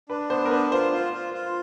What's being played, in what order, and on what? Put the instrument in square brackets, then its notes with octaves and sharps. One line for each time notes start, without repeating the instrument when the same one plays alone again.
[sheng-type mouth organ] D4 [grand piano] B4
[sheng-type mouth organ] B3 [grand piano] C5
[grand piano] A#4
[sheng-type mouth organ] D4 [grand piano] B4
[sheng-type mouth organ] F4 [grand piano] C5
[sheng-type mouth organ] F4
F4
F4